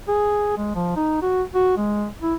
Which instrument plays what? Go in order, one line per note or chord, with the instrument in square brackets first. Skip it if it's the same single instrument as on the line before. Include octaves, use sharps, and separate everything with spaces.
[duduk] G#4
G#3
F3
D#4
F#4
F#4
G#3
E4